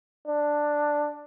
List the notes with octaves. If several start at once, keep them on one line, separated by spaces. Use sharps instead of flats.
D4